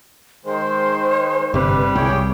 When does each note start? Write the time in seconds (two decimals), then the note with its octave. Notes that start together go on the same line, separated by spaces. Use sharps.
0.45 D#3 G#3 C5
1.54 G1 C3 G3 B4
1.95 C2 G#4 C#5 G5